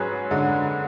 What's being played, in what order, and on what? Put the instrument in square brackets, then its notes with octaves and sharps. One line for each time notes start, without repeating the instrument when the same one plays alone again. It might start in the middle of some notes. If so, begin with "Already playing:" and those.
Already playing: [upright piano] G#2 F#3 C#4 G#4 B4
[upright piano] G#2 [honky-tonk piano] D3